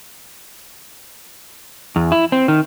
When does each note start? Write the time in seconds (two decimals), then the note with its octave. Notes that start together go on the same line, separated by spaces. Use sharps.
1.96 E2
2.12 E4
2.32 C4
2.48 D#3